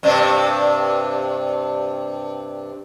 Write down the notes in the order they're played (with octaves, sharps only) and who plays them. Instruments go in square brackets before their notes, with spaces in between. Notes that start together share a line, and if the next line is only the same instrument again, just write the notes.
[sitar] G2 C3 D4